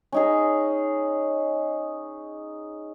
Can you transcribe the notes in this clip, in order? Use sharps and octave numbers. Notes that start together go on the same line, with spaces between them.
C#4 D#4 G#4